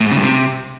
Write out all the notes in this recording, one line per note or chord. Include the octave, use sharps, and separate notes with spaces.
A2
G#2
C#3
G2
C3